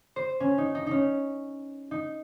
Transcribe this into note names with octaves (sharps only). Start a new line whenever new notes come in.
C5
C#4
D#4
D#4
C#4 D#4
D#4